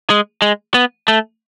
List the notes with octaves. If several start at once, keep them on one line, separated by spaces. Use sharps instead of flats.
G#3
G#3
B3
A3